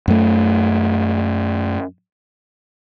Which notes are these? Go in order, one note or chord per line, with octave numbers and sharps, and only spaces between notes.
F#2 A3